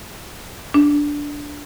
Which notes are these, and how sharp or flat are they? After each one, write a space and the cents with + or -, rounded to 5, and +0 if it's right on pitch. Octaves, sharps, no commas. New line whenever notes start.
D4 -10